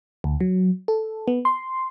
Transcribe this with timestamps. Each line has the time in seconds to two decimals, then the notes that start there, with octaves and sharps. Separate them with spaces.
0.24 D2
0.41 F#3
0.88 A4
1.28 B3
1.45 C6